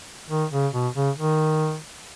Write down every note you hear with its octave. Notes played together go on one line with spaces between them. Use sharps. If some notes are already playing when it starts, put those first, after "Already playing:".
D#3
C#3
B2
C#3
D#3